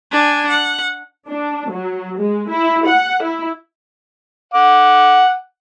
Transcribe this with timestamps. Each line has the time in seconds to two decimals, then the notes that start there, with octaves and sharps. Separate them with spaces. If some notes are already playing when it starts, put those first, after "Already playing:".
0.11 D4 G#5
0.47 F#5
1.28 D4
1.70 F#3
2.18 G#3
2.50 E4
2.87 F#5
3.23 E4
4.54 F#5 D6